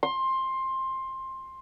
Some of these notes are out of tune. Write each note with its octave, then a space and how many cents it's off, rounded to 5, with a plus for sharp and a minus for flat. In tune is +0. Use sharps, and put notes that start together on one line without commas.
C6 +15